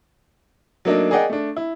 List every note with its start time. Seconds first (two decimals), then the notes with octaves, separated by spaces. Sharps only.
0.85 F#3 A3 A#3 D4 D#4
1.11 G#4 A#4 D5 D#5 F#5 G5
1.30 A3 D4
1.56 E4